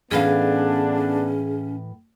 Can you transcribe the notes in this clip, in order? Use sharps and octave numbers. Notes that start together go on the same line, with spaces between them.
A2 E3 A3 B3 C#4 D4 G#4 F5